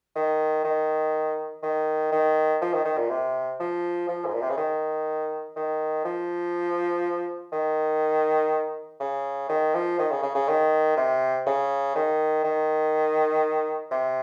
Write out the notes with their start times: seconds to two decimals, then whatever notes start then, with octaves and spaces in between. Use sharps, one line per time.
0.16 D#3
0.64 D#3
1.63 D#3
2.12 D#3
2.61 F3
2.73 D#3
2.85 D#3
2.98 A#2
3.10 C3
3.60 F3
4.08 F3
4.26 G#2
4.34 A#2
4.41 C3
4.50 C#3
4.57 D#3
5.56 D#3
6.05 F3
7.52 D#3
9.00 C#3
9.49 D#3
9.74 F3
9.99 D#3
10.11 C#3
10.23 C#3
10.35 C#3
10.48 D#3
10.97 C3
11.46 C#3
11.95 D#3
12.44 D#3
13.91 C3